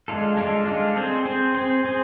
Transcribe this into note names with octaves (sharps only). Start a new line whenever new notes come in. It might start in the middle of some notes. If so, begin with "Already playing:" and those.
G#3 D4 F4 A4
G#3 D4 F4 A4
G#3 D4 F4 A4
C4 G#4 C5
C4 G#4 C5
C4 G#4 C5
C4 G#4 C5